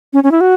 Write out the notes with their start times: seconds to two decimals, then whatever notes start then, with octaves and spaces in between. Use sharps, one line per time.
0.13 C#4
0.24 C#4
0.31 E4
0.41 F#4